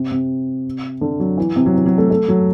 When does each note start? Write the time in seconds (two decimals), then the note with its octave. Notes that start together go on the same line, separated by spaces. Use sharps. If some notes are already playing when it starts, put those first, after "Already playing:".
Already playing: C3
0.11 C3
1.01 D3
1.20 F#3
1.38 E3
1.56 C3
1.66 F#3
1.74 E3
1.86 F#3
1.98 A3
2.10 A3
2.28 F#3